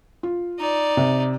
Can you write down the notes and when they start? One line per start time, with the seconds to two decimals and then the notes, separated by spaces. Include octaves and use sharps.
0.23 F4
0.59 D#4 D5
0.97 C3